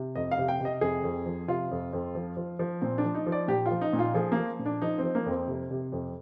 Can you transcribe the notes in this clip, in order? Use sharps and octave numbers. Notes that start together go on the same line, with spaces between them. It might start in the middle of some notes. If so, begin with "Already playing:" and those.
Already playing: C3
F2 D#5
F5
C3
G5
C3 D#5
F2 G#4
F2
F3
C3 F4
F2
F2
F3
F3
F3
A#2 C4
D4
F3
D#4
F3
D5
A#2 G4
F4
F3
D#4
A#2
F4
F3 G#4
A#3
F3
A#2
D4
F3 D#4
C4
F3
A#3
F2 C4
C3
C3
F2